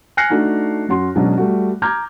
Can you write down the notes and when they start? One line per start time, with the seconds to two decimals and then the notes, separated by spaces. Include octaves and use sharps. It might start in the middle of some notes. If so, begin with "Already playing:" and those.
0.17 G#5 F6 F#6 A#6 C7 C#7
0.30 A3 D4 D#4 F#4
0.89 F#2 F#4 C6
1.15 B2 F#3 G#3 C#4 D4
1.37 G3 A3 F#4
1.82 A#5 D6 F6 G6 G#6